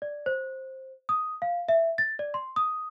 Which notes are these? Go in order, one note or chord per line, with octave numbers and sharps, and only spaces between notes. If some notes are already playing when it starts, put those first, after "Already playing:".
D5
C5
D#6
F5
E5
A6
D5
C6
D#6